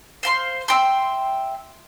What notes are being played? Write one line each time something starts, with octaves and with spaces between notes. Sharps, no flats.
C5 F5 C6
E5 G5 C6